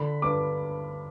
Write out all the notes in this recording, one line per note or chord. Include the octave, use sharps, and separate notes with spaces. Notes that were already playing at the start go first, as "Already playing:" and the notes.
Already playing: D3 B5
G2 D6